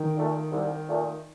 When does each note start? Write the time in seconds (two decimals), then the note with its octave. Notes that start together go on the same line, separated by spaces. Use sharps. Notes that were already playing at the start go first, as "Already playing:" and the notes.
Already playing: D#3
0.16 A#2 A3
0.52 C2
0.88 A#2 A3